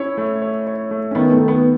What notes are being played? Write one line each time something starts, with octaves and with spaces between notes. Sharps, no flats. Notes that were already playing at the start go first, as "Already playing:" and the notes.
Already playing: C#4 E4 C#5
A3
C#5
C#5
A3
C#4
D#3 B3
A3
D#3
B3